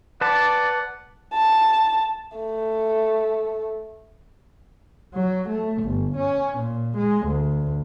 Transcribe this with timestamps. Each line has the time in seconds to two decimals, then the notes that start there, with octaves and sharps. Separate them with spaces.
0.21 B4 D5 F#5 A5
1.34 A5
2.37 A3
5.15 F#3
5.48 A3
5.83 G1
6.16 C#4
6.58 A#2
6.97 G#3
7.26 D2